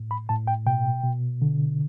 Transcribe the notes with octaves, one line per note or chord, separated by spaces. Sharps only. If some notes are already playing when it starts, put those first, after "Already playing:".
Already playing: A2
B5
A2 A5
G5
B2 G5
B2
D3